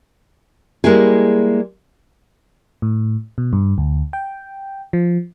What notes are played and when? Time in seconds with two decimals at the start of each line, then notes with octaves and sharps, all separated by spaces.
0.84 G3 G#3 A#3 E4 G#4
2.82 A2
3.38 B2
3.53 G2
3.78 D2
4.13 G5
4.93 F3